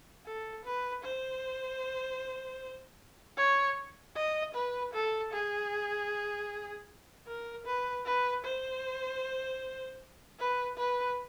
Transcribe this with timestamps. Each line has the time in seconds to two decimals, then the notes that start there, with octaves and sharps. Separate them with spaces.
0.26 A4
0.65 B4
1.04 C5
3.37 C#5
4.16 D#5
4.55 B4
4.94 A4
5.33 G#4
7.27 A#4
7.66 B4
8.06 B4
8.45 C5
10.39 B4
10.78 B4